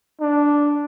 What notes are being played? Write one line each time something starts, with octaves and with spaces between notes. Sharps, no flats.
D4